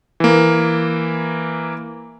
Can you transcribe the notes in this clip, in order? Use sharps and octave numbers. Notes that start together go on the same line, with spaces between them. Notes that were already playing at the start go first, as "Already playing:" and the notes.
E3 A#3